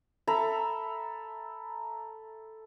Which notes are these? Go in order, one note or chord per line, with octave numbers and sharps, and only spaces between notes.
A4 E5 A#5 B5